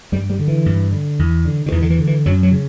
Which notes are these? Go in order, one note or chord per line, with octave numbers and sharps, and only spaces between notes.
G2 G3
G3
D3
E3
G2
D3
E2
D3
D3
E2 E3
D3
E3
D3
E3
F#2 F#3
F#3
C#3